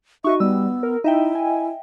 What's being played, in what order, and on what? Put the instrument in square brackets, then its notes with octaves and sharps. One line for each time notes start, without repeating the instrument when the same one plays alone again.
[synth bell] D#4 F#4 D#5 [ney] E5 [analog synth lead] C#6
[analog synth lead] G3 [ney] B3 [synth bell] E6
[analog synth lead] A#4
[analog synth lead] D#4 [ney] E4 [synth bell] D#5 E5 G5
[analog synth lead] G#5